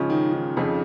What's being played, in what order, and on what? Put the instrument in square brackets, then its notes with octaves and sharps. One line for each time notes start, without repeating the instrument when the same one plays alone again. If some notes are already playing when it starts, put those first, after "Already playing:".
Already playing: [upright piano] G#2 F3 C#4 [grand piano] C#3
[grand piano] D#3
D#3
[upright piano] F2 C#3 F3